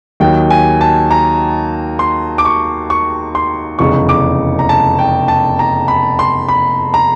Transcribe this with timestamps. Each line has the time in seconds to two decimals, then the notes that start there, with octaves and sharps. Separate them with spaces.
0.20 D#2 D#3 F#3 G5
0.50 G#5
0.81 A5
1.11 A#5
1.99 C6
2.38 D6
2.45 C#6
2.90 C#6
3.35 C6
3.79 F1 E2 C#3 C#6
4.09 D6
4.59 A#5
4.69 A5
4.99 G5
5.28 A5
5.59 A#5
5.88 B5
6.19 C6
6.48 B5
6.94 A#5